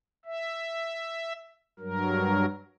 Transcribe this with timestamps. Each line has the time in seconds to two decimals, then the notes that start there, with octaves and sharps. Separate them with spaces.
0.25 E5
1.80 G2 F#3 A#4